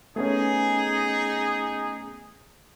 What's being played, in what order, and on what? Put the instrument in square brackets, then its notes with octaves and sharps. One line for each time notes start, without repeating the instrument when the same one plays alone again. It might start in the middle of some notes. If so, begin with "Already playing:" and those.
[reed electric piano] A3 B3 C#4 [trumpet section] D#4 G#4